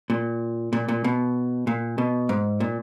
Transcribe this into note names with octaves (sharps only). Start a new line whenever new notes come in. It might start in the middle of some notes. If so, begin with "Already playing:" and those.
A#2
A#2
A#2
B2
A#2
B2
G#2
A#2